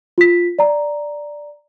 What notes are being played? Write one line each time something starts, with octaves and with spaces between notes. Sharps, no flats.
F4 B6
D5 A#5